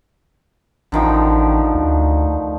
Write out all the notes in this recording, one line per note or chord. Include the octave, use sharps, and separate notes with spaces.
A1 D3 D#3 F3
D2